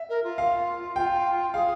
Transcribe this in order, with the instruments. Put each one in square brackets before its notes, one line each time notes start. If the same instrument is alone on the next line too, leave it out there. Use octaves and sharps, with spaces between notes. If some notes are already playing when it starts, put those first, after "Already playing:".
Already playing: [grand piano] E5
[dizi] A#4
F4
[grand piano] F5
[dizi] F4 [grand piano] G5
[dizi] G#4 [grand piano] F5